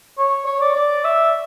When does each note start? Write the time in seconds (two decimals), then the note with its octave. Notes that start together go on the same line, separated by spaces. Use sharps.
0.18 C#5
0.46 C#5
0.61 D5
0.75 D5
1.05 E5